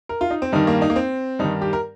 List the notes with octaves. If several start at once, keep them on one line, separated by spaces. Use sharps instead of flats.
A#4
F4
D#4
C4
G2 D#3 D#4
A#3
D#4
A#3
C4
G2 D#3 D#4
G4
A#4